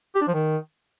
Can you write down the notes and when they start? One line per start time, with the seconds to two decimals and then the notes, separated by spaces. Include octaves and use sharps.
0.15 G4
0.21 D4
0.28 F3
0.34 D#3